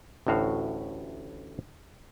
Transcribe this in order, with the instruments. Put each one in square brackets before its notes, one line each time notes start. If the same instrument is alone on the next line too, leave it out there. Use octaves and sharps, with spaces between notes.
[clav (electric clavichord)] A1 D2 A2 F#4 F5